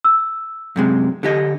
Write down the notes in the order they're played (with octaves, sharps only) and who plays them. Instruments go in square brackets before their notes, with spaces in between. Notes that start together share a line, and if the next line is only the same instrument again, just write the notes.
[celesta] E6
[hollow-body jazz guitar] F#2 C3 G#3
D3 G4 D#5